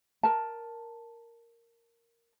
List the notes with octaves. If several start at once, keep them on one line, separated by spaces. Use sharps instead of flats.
A#4 A5